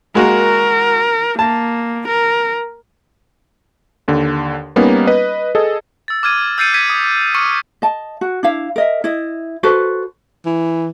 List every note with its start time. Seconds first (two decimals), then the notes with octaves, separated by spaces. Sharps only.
0.15 G#3 A#3 F#4 A#4
1.39 A#3 A5
2.08 A#4
4.08 D#2 D3
4.76 G3 A#3 B3 C#4 D#4
5.07 B4 D#5
5.55 G#4 A4 D#5
6.08 E6 A6
6.23 D6 F6 G#6 D#7
6.58 E6 G6 A6 C7 C#7 D#7
6.74 G#6 B6 D#7
6.90 D#6
7.34 C#6 D6 E6 F6 C#7 D#7
7.82 D#5 A5
8.21 F#4
8.43 D4 E4 F5
8.76 A#4 D#5 E5
9.04 E4 D#5
9.63 F#4 A4 B4 C5
10.45 E3